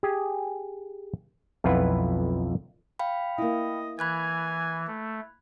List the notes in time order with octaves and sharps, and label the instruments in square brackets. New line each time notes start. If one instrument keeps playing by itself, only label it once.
[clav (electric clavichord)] G4 G#4 G#5
B1 F2 E4 F4 B4 F#5
[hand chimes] F5 G5 B5
[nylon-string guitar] A#3 E4 [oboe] D#5
[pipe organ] E3 [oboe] G#5 [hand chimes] B5 F#6 G#6
[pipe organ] A3